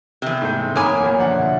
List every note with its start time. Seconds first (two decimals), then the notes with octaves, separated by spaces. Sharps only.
0.22 E2 C3
0.42 G#2 A3 G6
0.76 F#2 A#3 C#5 G#5 B5 D6 D#6
1.02 E2 A#2
1.18 E2 D3 F3 D4 F#5
1.32 B2